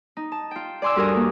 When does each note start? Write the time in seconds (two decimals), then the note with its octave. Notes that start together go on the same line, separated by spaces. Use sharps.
0.17 D#4
0.32 A5
0.51 F4 G5
0.82 D5 G#5 C6 D6 E6
0.96 G2 F#4 A4 A#4 G#5 D#6
1.16 A#3